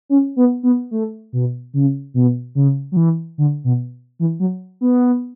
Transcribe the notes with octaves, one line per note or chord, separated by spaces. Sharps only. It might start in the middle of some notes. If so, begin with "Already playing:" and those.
C#4
B3
B3
A3
B2
C#3
B2
C#3
F#3
E3
D3
B2
E3
F#3
B3